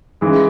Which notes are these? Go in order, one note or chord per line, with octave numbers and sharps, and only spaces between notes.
C#3 E3 G#3